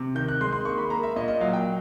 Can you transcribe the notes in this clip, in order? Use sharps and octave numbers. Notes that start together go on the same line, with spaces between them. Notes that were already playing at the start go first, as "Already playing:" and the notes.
Already playing: C3
D#3 G6
F#6
G#3 C6
C6
A#3 C#6
B5
A#3 A#5
E5
A#2 D#5
D#5
F#3 F5
G5